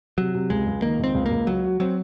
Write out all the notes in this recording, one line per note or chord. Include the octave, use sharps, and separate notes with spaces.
C3 F#3
C3
C#2 G#3
C#2
D#3 A#3
C#2 C4
C#2
A#3
C#2
F#3 F#4
F#4
F#3 C4